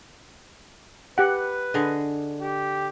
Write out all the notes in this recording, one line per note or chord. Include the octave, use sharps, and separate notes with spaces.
G4 B4 F#5
D3 G#4 D#5
G4